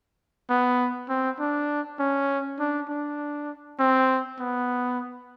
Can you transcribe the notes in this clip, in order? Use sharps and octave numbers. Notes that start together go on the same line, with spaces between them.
B3
C4
D4
C#4
D4
D4
C4
B3